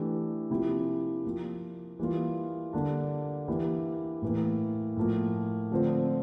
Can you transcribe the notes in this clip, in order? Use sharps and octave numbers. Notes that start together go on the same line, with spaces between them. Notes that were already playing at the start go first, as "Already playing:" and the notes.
Already playing: E3 A3 D4 G4
C3 F3 A#3 E4 G4
F3 A#3 F4
E3 G3 A#3 F4
D3 G3 A#3 D4
E3 A#3 E4 G4
A2 E3 A#3
A2 F3 A#3
D3 F3 A3 C4